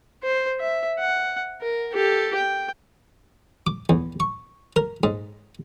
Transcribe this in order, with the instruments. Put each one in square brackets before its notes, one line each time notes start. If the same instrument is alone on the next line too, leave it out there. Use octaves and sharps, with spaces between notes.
[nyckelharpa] C5
E5
F#5
A#4
G4 A4
G5
[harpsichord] D6
E2
C#6
A#4
G#2